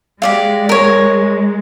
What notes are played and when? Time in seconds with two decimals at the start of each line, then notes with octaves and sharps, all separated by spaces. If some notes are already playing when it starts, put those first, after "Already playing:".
0.22 G#3 G4 D5 F5
0.69 A#4 C#5